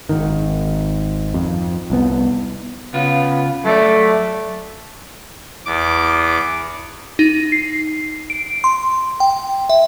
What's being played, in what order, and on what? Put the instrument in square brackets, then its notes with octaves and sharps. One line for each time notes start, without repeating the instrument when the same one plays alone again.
[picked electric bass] G#1 D#3
F2
C2 B3
[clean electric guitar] C#3 F4 [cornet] B3
[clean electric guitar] F#3 A4 D5 [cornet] A3
[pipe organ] E2 D6
[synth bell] D#4
C7
D7
C6
G5
E5